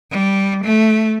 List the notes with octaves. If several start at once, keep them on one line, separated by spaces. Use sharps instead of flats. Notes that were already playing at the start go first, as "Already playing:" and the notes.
G3
A3